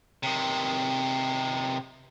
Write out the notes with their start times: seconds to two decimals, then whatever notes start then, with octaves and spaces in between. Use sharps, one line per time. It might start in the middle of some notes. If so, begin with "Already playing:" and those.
0.23 C3 D#3